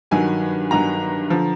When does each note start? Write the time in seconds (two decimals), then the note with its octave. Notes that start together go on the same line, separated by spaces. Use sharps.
0.11 G2 D#3 F#3 G#5
0.71 G2 D#3 F#3 A#5
1.30 D3 F3